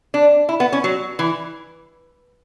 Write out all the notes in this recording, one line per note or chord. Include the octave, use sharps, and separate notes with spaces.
D4
E4
B3
C#4
F#3
E3